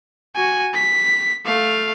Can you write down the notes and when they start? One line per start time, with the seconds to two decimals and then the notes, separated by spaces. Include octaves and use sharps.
0.35 F#4 G#5
0.74 B6
1.46 A3 F5